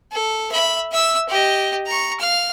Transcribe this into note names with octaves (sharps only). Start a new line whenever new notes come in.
A4
E5 B5
E5 E6
G4 D#5
A#5 C#6
F5 F6